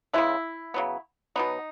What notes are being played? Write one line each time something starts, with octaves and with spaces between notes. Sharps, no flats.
C#3 G#3 B3 E4
C#3 F#3 B3
B2 F#3 B3 D#4